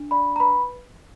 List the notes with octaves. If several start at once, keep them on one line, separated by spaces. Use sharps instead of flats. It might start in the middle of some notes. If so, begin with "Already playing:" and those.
Already playing: D4
D5 B5
A#5
B4 B5